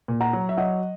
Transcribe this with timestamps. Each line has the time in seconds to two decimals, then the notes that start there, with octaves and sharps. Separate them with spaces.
0.08 A#2
0.21 F#5 A#5
0.33 F#3
0.49 E5
0.57 F#3 D#5 F#5